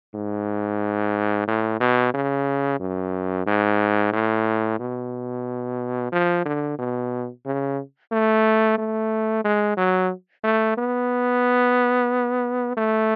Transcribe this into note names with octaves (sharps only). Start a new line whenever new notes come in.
G#2
A2
B2
C#3
F#2
G#2
A2
B2
F3
D3
B2
C#3
A3
A3
G#3
F#3
A3
B3
A3